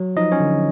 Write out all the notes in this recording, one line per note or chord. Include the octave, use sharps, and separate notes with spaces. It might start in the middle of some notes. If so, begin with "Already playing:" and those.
Already playing: F#3
F3 D#4 D#5
C#4 C#5
D3